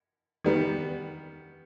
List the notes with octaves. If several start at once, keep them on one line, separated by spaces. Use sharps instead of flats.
D#3 G3 B3